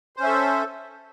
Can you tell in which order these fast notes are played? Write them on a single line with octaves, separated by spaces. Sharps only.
C5 C#4 E5 A4